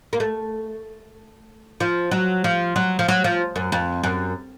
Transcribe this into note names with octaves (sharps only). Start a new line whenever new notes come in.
A#3
A3
F3
F#3
F3
F#3
F3
F#3
F3
F#2
F2
F#2